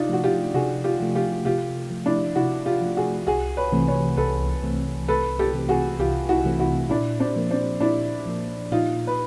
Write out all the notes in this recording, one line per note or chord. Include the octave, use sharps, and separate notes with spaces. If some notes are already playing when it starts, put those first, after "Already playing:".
Already playing: C3 D4 D#4 F4
F3 A3 F#4
F4 G4
C3 F#4 G#4
F4 G4
F3 A3
F4 G4
C3 F4 G4
F3 A3
D4 E4
C3 E4 F#4
F4 G4
F3 A3
F#4 G#4
C2 F#4 G#4
B4 C#5
C3 E3 A3 C4
B4 C#5
C2 A4 B4
C3 E3 A3 C4
C2 A4 B4
G4 A4
C3 E3 A3 C4
F#4 G#4
C2 F4 G4
E4 F#4
C3 E3 A3 C4
E4 F#4
A#2 D4 E4
C4 D4
F3 A#3
C4 D4
A#2 D4 E4
F3 A#3
A#2 D#4 F4
B4